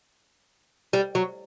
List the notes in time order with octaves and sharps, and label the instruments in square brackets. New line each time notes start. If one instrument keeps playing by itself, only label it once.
[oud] G3
F#3